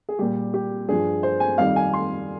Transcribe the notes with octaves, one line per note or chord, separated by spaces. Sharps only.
G#4
A#2 G3 G4
G4
G2 F3 G#4
C5
G#5
F2 D#3 G3 F5
G#5
C6